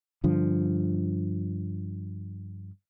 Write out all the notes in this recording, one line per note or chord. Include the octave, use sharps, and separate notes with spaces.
G2 D3 F3